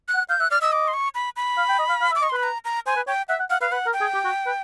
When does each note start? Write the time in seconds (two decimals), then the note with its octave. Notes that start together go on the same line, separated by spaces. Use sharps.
0.08 F#6
0.15 F#5
0.29 F5 G6
0.40 E5 F#6
0.51 D5 F6
0.62 D#5 E6
0.72 D6
0.88 C6
0.94 C#6
1.15 B5
1.36 B5
1.58 F5
1.69 G5
1.79 D#5
1.89 F5
2.01 F5
2.11 E5
2.15 D6
2.22 D#5 C#6
2.30 C6
2.33 B4 B5
2.43 A#5
2.65 A#5
2.86 C5 G#5
2.96 B4
3.07 C#5 G5
3.29 E5 F#5
3.40 F#5
3.50 F5 F#5
3.61 B4 F5
3.72 B4 F#5
3.86 A#4
3.93 G5
4.01 G#4
4.14 G4
4.25 F#4
4.46 B4